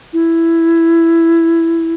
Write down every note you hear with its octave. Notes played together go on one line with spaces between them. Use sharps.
E4